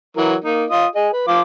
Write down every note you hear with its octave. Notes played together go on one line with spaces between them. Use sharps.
E3 F#3 A#4
A#3 D#4
F4 D#5 D#6
G#4 D#5
B4
F3 F4 D6